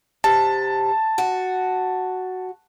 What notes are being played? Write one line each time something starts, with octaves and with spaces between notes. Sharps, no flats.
C3 A5
F#4